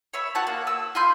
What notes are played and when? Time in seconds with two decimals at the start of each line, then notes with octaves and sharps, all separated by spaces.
0.13 C#5 E5 B5
0.35 F#4 F#5 A5
0.47 A#3
0.67 E6
0.95 F4 B5 C6 G6